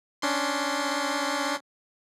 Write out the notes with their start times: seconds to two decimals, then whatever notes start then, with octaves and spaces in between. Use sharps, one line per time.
0.22 C#4 D4 C6